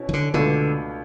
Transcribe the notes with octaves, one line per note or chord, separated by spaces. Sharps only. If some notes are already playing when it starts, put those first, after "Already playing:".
Already playing: B2 C#4 E4
E3
D3
C#2 B2 D3 A3 D4